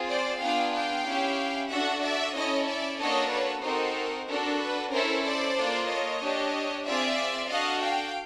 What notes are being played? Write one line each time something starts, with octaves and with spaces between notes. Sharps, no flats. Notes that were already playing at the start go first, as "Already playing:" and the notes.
Already playing: C4 F4 G#4
C5 D5
B3 D4 F4 G#4 F5 G5
F5 G5
C#4 E4 G4
D4 F#4 A4 E5 F#5
D5 E5
C#4 E4 A4 C#5 D#5
D5 E5
A#3 D4 F#4 A4 C#5 D#5
B4 C#5
C4 D#4 F#4 A4 A#4 C5
D4 F#4 A4 A#4
B4
C#4 E4 A4 A#4 C5
C5 D5
A#3 D4 F4 A4
C#5 D#5
D4 G4
C4 F4 G#4 D5 E5
D4 F#4 A4 D#5 F5
F5 G5